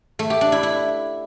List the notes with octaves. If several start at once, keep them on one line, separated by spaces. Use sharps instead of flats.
A3
G4
D4
E4
E4